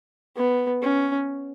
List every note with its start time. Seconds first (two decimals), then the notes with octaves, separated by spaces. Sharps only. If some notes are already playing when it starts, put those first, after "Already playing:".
0.36 B3
0.82 C#4